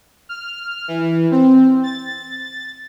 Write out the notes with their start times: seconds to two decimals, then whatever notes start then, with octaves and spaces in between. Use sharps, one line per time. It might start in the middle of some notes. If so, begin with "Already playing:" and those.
0.29 F6
0.88 E3
1.31 C4
1.83 A6